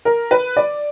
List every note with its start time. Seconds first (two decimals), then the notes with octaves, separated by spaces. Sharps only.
0.05 A#4
0.31 B4
0.57 D5